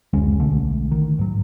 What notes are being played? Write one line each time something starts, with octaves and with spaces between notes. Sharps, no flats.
F#1 D2 G#3 C#4
B1 D3 A3
D#3
G#2 F#3